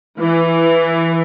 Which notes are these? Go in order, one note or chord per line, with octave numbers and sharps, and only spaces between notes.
E3